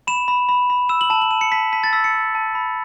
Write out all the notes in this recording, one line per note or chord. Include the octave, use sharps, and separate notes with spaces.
B5 E7
B5
B5
B5
E6 E7
F#7
A5 E7
F#7
A5 E7
C#7
A5 B6
A5 B6
A6
E6 B6
C#7
A5
A5
B5